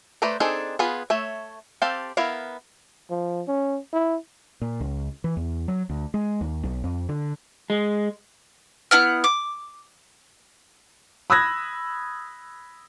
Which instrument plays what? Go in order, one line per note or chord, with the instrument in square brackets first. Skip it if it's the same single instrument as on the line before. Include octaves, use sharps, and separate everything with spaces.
[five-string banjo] A3 B4 C5 D5 A#5
C4 D4 D#4 G#4 A4
B3 F4 G#4 B4
A3 C#5 E5
C4 G4 A4 F5 A5
B3 E4 A#4 F5
[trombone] F3
C#4
E4
[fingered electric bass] A#2
C#2
E3
E2
F#3
D2
G#3
D#2
B1
F2
D3
[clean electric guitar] G#3
[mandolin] B3 E4 F#5 F6
D6
[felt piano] B5 D#6 E6 F#6 G#6 A#6